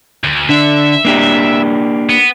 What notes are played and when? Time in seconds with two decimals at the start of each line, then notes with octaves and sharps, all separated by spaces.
0.24 D2
0.49 D3 D4 E5
1.05 A#3 D4 G4
2.10 B3